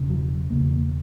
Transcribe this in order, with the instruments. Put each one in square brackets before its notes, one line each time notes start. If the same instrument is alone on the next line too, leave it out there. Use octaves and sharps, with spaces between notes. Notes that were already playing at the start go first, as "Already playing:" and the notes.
Already playing: [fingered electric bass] E1 C#3
F#3
E1 E2 C#3 A#3
A#3